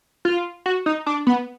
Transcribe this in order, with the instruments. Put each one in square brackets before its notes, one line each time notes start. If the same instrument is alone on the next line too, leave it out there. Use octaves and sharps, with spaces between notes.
[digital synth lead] F4
F#4
D#4
D4
B3